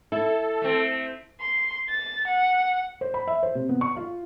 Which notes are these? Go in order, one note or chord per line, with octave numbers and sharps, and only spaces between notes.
E4 A4
A3 C4
C6
A6
F#5
C5
B5
E5
C5
C3
B3
C#6
F4